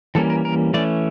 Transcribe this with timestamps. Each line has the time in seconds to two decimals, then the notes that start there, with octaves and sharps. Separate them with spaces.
0.15 E3 G3 A#3 C#4 A4
0.30 A#4
0.45 A#4
0.74 E3 A3 C#4 D5